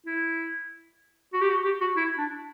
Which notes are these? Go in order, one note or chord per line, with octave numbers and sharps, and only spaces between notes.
E4
F#4
G4
F#4
G4
F#4
E4
D4